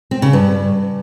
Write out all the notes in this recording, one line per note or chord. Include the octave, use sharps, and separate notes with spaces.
C4
C#3
G2